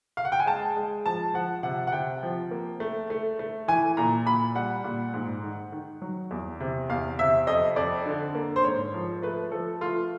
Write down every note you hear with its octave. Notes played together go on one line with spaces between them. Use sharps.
F5
F#5
G5
G#5
G#3 A5
G#3
F3 A5
F3 F#5
C3 F#5
F#5
C3 G5
F3
A#3
A3
A3
A3
E3 G#5
A#2 A#5
A#2 B5
G3 F#5
A#2
G#2
D#3
D#3
F#3
E2
C3
E2 F5
C3 E5
F2 D#5
F2 D5
D3
A#3
C5
G#2 C#5
F3
A3 B4
F3 A4
A3 F4